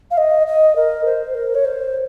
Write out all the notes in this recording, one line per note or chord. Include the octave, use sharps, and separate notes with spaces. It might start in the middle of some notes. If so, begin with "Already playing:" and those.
F5
D#5
D#5
A#4
C5
A#4
C#5
C5